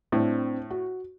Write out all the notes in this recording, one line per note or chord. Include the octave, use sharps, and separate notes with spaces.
A2 C4 D4
F#4